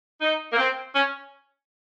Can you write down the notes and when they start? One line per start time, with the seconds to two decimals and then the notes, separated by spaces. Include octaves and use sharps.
0.21 D#4
0.53 A#3
0.58 C4
0.95 C#4